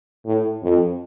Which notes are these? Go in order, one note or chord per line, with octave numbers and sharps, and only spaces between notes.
A2
F2